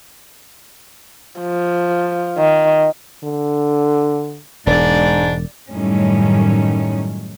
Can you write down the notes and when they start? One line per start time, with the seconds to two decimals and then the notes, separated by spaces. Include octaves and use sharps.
1.40 F3
2.38 D#3
3.24 D3
4.67 E1 G#2 D4 D5
5.71 F#2 A2 D#3 G3 C#4